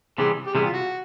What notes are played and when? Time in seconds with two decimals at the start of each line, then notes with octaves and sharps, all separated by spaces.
0.18 C3 E3 G3 B3 G#4
0.46 G4
0.55 C3 E3 G3 B3 G#4
0.65 F4
0.73 F#4